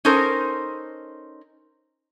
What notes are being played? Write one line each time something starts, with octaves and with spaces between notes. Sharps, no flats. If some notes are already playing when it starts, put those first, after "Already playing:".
C#4 D#4 A4 A#4 C5